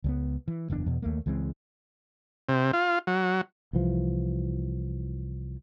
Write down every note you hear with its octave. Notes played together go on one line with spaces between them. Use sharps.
C#2 G3 B3
E3
F#1 E2 G2 D4
E2 B2
D#2 A3 A#3
C#2 E3 G#3 C4
C3
F4
F#3
C2 E3 F3